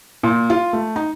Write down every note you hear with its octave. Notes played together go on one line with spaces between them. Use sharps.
A#2
F4
A3
D#4